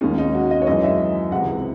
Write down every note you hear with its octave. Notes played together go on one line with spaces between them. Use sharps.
D#2 D#3 G#3 C#4
D#4
F#4
D#5
C#5
F#2 E3 G#3 D#5
E5
C#2 C3 E3 F#5